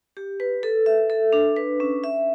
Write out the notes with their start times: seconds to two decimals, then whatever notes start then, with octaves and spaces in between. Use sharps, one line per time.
0.17 G4
0.40 B4
0.63 A4
0.86 E5
1.10 A4
1.33 D4
1.56 B4
1.80 C#4
2.04 E5